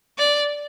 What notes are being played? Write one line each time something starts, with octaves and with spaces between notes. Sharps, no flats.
D5